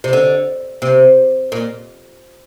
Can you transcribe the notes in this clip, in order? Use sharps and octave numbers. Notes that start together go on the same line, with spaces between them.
C3
D3
C3
A#2